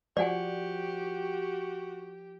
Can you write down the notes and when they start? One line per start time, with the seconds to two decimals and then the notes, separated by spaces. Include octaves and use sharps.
0.17 F3 F#4 G4 D5 F#5 G#5